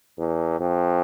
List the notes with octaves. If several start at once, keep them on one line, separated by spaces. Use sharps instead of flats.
E2
F2